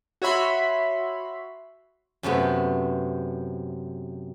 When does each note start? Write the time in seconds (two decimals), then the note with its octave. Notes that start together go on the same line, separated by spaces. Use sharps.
0.22 F#4 C#5 E5 B5 C6
2.23 F#2 C3 A3 B3